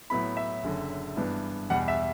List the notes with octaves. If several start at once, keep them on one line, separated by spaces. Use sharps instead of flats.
A2 F#3 B3 E4 B5
E5
F#1 F#2 D3
G2 E3 B3 D4
E2 B2 G3 F#5
E5